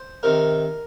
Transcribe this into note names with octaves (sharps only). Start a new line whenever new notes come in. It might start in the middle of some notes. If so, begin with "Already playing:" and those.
Already playing: C5
C3 D#3 A#4